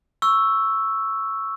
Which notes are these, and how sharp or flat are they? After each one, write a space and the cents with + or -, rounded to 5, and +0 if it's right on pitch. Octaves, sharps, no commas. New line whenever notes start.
C#6 +0 E6 +0